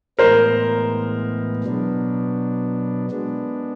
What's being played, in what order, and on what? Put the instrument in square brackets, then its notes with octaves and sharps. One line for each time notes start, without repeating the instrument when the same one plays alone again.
[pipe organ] A2 E3 G#3 B3 [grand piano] A#4 C5
[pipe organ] B2 F#3 B3 D4
G#3 B3 D4